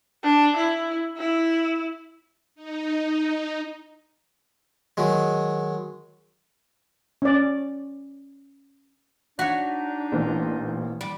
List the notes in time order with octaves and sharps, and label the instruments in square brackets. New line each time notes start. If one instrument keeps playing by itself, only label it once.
[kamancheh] D4
E4
E4
[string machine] D#4
[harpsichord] D#3 F#3 G#3
[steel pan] C#4 D5
[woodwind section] D4 D#4 [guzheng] F#4 C#5 [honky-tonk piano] B6
[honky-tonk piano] A1 A#2 C5
[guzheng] G3